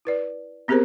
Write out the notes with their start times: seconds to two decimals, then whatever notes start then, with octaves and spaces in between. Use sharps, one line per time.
0.05 E4 B4 D5
0.68 B3 C4 G4 G#4 A#4 C5